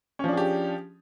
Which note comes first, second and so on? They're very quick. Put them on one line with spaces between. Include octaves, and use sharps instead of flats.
C#4 F3 D4 G#4 G4